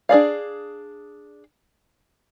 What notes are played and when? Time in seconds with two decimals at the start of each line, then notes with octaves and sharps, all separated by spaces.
0.09 D4 G#4 D5 F5